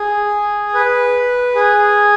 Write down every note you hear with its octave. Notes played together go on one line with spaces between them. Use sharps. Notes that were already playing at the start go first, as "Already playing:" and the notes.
Already playing: G#4
B4
G#4